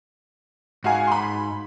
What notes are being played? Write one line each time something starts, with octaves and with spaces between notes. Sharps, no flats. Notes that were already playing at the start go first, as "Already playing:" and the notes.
G#2 F#4 F5 G#5
B5 C6